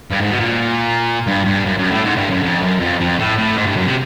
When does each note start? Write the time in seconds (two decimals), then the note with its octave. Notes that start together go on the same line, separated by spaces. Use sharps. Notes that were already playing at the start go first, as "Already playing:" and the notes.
0.12 G2
0.21 G#2
0.31 B2
0.40 A#2
1.27 G2
1.45 G2
1.65 F#2
1.78 F#2
1.90 A2
2.04 G#2
2.16 G2
2.30 F#2
2.43 F2
2.62 F#2
2.80 F2
3.00 F2
3.19 A2
3.38 A2
3.57 G#2
3.67 G2
3.77 F#2
3.87 C3